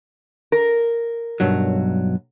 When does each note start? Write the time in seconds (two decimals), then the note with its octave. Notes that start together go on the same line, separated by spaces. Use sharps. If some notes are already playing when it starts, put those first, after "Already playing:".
0.52 A#4
1.40 B1 G2 F#3